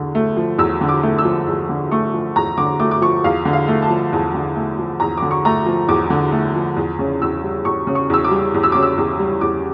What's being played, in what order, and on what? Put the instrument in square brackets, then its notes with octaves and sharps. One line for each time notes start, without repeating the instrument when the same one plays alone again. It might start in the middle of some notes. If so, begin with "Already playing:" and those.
Already playing: [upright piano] E2 D3
A3
F3
E2 E6
D3
D6
A3
E6
F3
E2
D3
A3 C#6
F3
E2 A#5
D3 D6
A3 D6
D6
F3 C#6
E2 F5
D3
F5
A3
A5
F3
E2
D3
A3
F3
E2 A#5
D3 D6
C#6
A3 A#5
F3
E2 D6
D3
A3
F3
E2
C#3
E2 E6
G3
E2 C#6
C#3
C#6
E2 E6
D6
G3
E2
E6
C#3 D6
E6
E2
G3
E2 D6